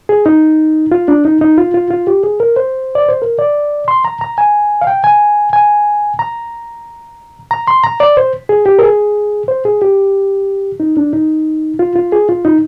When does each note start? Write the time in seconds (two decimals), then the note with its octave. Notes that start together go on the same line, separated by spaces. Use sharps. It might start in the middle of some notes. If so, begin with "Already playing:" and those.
0.09 G#4
0.26 D#4
0.92 F4
1.08 D4
1.25 D#4
1.41 D#4
1.58 F4
1.74 F4
1.91 F4
2.07 G4
2.24 G#4
2.40 A#4
2.56 C5
2.95 D5
3.08 C5
3.22 A#4
3.39 D5
3.88 C6
4.05 A#5
4.21 A#5
4.38 G#5
4.81 F5
4.87 G5
5.04 G#5
5.53 G#5
6.19 A#5
7.51 A#5
7.68 C6
7.84 A#5
8.00 D5
8.17 C5
8.49 G#4
8.66 G4
8.79 A#4
8.83 G#4
9.48 C5
9.65 G#4
9.82 G4
10.80 D#4
10.97 D4
11.13 D#4
11.79 F4
11.96 F4
12.12 G#4
12.29 F4
12.45 D#4